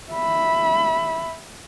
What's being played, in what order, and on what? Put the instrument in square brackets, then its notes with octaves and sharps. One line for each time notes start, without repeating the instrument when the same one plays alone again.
[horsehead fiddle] E5 B5